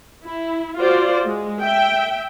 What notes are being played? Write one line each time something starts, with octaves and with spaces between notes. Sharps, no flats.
E4
F4 F#4 C5 D5
G#3
E5 G5